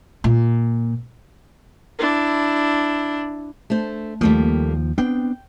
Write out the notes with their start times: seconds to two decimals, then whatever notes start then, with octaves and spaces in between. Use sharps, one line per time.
0.24 A#2
1.99 D4 E4
3.70 A3 D4 C5
4.21 D#2 F3 G3 A3 A#3
4.98 B3 C4 D4 G5